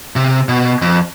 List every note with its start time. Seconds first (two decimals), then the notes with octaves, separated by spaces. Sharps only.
0.16 C3
0.49 B2
0.82 F2